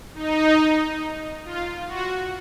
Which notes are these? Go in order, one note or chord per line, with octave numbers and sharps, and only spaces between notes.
D#4
F4
F#4